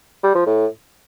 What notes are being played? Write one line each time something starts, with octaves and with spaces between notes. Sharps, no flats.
G3
F3
A2